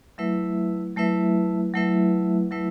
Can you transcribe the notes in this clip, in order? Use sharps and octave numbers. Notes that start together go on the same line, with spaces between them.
F#3 A3 E4 B4 E5
F#3 A3 E4 B4 E5
F#3 A3 E4 B4 E5
F#3 A3 E4 B4 E5